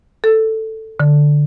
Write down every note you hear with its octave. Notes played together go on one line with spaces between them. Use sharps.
A4
D3